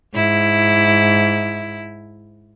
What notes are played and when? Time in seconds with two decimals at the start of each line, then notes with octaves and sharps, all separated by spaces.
0.15 G#2 E4